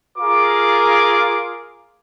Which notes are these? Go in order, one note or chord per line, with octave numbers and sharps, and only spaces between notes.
F4 G#4 A#4 D6